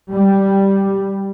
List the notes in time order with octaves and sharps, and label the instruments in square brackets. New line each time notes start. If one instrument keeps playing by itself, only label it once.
[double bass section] G3